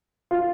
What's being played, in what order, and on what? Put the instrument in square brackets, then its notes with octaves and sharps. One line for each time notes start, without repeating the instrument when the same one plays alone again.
[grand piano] F4